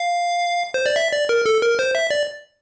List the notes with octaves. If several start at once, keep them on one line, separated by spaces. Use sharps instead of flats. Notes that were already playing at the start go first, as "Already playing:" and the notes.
Already playing: F5
C5
D5
E5
D5
A#4
A4
A#4
C5
E5
D5